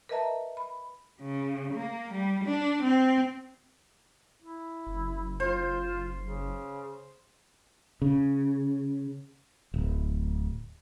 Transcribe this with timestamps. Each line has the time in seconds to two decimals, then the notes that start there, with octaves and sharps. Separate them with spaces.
0.09 A#4 B4 D#5 E5 A5 A#5
0.57 B5
1.21 C#3
1.74 A#3
2.14 G3
2.45 D4
2.83 C4
4.42 E4
4.87 F#1
5.40 F4 C5
6.23 C#3
8.02 C#3
9.74 D1